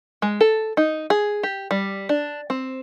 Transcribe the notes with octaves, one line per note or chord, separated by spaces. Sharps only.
G#3
A4
D#4
G#4
G4
G3
D4
C4